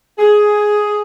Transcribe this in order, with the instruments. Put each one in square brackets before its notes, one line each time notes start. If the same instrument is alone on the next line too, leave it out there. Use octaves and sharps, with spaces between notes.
[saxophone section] G#4